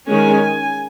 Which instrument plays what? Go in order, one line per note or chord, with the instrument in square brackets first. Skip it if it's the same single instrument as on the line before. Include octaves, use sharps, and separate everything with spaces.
[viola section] D#3 G#3 C#4 G#5